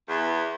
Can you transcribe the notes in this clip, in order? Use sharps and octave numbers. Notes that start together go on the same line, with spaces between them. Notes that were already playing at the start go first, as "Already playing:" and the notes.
E2